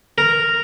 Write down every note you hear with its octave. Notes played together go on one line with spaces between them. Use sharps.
A#4